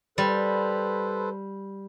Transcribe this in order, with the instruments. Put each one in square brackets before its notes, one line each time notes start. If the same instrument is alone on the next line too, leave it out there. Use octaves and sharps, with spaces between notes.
[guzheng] G3 [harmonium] A4 B4 C5